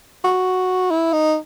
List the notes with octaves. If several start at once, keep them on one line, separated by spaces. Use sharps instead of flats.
F#4
E4
D#4